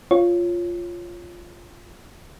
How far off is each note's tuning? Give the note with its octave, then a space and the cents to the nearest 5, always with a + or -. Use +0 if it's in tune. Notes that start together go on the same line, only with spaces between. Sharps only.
F4 +0 C#5 +0